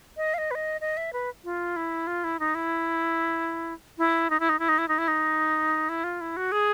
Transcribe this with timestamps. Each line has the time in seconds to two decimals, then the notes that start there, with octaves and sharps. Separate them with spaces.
0.17 D#5
0.34 F5
0.38 D#5
0.51 B4
0.55 D#5
0.81 D#5
0.97 E5
1.13 B4
1.44 F4
1.76 E4
2.07 F4
2.24 E4
2.40 D#4
2.55 E4
3.98 E4
4.30 D#4
4.40 E4
4.49 D#4
4.59 E4
4.69 D#4
4.78 E4
4.88 D#4
4.98 E4
5.08 D#4
5.89 E4
6.04 F4
6.21 E4
6.37 F#4
6.52 G#4